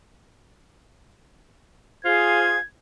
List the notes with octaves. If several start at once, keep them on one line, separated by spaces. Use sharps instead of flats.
F4 G#4 C5 F5 G#6